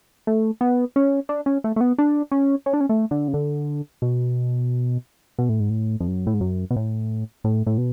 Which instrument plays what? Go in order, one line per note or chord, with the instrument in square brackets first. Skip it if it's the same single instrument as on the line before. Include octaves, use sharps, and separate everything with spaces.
[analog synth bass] A3
B3
C#4
D4
C#4
A3
A3
B3
D4
C#4
C#4
D4
C#4
A3
D3
C#3
D3
B2
B2
A2
G#2
A2
F2
F#2
A2
G#2
F#2
B2
A2
A2
A2
B2